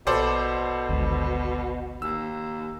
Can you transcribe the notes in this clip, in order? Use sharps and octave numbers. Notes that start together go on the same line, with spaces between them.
A#1 B2 A4 C5 D5
G#1 D2 G#2
D#2 E6